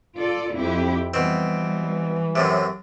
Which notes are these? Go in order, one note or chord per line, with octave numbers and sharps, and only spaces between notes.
F4 A4 D5
F2 E4 G4
B2 E3 G3 C4
F#2 A2 C3